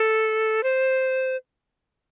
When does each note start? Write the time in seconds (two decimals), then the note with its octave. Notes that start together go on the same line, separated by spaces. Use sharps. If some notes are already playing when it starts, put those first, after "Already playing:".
Already playing: A4
0.63 C5